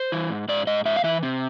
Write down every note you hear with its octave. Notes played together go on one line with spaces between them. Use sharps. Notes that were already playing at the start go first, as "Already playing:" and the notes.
Already playing: C5
E3
G#2
G#2 D5
G#2 D#5
G#2 E5
F5
E3 E5
C3